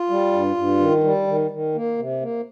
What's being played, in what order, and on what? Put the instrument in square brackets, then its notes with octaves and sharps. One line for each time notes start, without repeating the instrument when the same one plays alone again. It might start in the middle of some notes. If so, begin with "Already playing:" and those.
Already playing: [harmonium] F4
G3
G2
G2
D#3
G3
D#3
D#3
A#3
C3
A#3